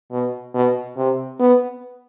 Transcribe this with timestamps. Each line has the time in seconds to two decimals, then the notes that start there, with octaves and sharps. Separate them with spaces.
0.12 B2
0.54 B2
0.97 C3
1.40 B3